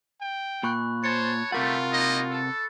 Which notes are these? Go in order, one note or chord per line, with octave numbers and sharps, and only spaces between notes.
G5
A#2 B5 C#6 F#6
C5 C#5 A5 C#7
C3 G3 A3 F4 A#4 F#5 A6
A#3 D#4 D#5
A4